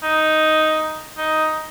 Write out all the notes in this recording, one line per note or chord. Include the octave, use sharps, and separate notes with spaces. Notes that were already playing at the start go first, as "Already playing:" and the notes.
D#4
D#4